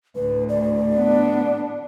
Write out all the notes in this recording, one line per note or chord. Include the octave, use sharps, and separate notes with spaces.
D2 A2 B4
D5
B3 D4